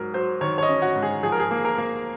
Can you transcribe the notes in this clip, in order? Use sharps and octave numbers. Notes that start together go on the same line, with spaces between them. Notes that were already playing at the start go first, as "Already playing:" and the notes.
Already playing: G#2 F#3 A#4
F#3 C5
D#3 C#5
C#5
D#5
C#4
F#4
G#2
G#4
F3 G#4
A#4
G#4
A#3
A#4
A#3